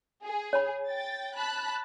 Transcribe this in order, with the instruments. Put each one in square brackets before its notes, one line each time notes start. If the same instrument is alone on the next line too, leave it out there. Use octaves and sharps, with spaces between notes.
[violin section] G#4
[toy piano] C#5 B5
[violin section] G5 A6
A5 B5 F#6